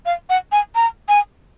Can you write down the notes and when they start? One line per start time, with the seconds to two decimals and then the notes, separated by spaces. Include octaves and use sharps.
0.06 F5
0.30 F#5
0.52 G#5
0.75 A#5
1.09 G#5